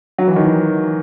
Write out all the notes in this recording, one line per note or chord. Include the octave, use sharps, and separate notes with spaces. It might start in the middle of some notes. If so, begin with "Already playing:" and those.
F#3
E3
D#3
E3